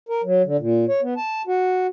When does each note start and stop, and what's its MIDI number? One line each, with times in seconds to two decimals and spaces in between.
0.09 0.21 70
0.24 0.42 54
0.45 0.57 50
0.59 0.85 46
0.89 1.01 73
1.02 1.14 59
1.17 1.42 81
1.47 1.87 66